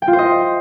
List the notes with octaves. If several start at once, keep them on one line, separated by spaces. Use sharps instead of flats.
G5
F4
C5
D#5